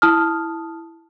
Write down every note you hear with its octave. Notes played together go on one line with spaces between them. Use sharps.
E4 A5 D#6 F6